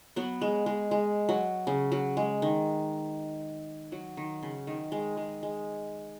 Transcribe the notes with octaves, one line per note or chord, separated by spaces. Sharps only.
F#3 B3
G#3
G#3
G#3
F#3
C#3
F#3
G#3
D#3
F#3
D#3
C#3
D#3
G#3
G#3
G#3